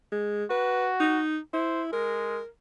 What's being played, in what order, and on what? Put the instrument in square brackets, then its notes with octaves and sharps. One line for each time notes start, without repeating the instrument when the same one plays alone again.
[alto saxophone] G#3
[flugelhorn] F#4 [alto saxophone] B4
[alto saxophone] D#4
[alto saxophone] E4 [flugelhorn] C5
[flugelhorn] G#3 [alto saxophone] A#4